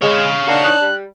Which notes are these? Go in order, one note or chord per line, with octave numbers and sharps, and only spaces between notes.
G#3 C#5 F5
A#3 D4 D#4 F#4
E3 C#4 D#4 F#6
G3